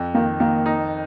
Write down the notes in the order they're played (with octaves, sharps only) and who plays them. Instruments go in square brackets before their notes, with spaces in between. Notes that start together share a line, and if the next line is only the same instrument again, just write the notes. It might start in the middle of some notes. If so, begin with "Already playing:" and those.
Already playing: [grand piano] F2
[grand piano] D#3 [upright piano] A#3
[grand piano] D#3 [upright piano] A#3
[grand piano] D#4